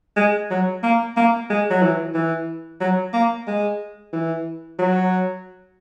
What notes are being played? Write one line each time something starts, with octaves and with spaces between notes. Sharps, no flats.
G#3
F#3
A#3
A#3
G#3
F#3
E3
E3
F#3
A#3
G#3
E3
F#3